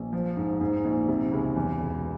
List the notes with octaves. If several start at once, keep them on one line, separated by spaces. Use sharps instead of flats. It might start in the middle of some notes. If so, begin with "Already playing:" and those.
Already playing: A#1
F3
G#2
G#2
A#1
C3
C#2
E2
E1